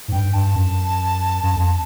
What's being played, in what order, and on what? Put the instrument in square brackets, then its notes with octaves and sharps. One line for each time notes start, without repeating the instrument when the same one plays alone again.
[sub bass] G#2
[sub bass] G2 [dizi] G5
[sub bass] G2 [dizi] A5
[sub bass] F#2
F#2
F2